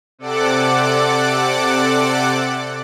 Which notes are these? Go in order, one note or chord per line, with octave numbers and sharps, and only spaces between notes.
C3 A4 D5 F#5 D6